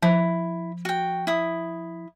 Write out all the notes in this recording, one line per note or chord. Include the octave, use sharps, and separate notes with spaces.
F3 E4
F#4 G5
E4 D#6